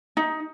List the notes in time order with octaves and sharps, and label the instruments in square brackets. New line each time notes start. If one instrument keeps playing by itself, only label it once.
[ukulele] D#4